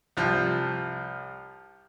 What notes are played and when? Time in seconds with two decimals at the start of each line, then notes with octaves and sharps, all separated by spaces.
0.17 C2 F3